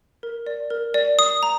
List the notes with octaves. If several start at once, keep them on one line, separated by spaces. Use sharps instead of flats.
A#4
D5
A#4
D5
D#6
A#5